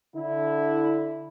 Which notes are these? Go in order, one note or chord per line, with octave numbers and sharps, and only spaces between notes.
D3 E4